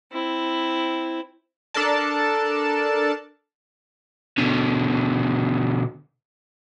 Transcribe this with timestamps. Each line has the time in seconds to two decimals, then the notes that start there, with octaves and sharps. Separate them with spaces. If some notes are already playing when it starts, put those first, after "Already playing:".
0.12 C4 E4
1.74 D4 A4 A#4 D5 A5
4.38 B2 D3